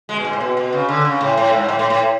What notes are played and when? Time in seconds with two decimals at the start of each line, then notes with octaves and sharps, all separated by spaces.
0.09 G#3
0.17 B2
0.25 G#2
0.33 A2
0.40 B2
0.57 B2
0.73 C#3
0.89 D3
1.05 C#3
1.21 A2
1.37 A2
1.53 G#2
1.69 A2
1.79 A2
1.90 A2